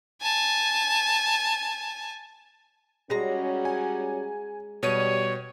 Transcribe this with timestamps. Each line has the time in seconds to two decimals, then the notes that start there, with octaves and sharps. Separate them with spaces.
0.22 G#5 A5
3.10 G3 G#3 C#4 F#4 A#5
3.65 G#5
4.83 B2 G3 C#5 D#7